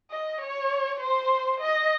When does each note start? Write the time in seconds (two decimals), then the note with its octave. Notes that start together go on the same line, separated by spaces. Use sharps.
0.11 D#5
0.41 C#5
1.00 C5
1.61 D#5